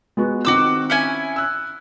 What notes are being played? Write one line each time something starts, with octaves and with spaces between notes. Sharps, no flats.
G#3 B3 F#4
D#3 C4 F#4 D6 E6
C#4 E4 G#5
E6 F#6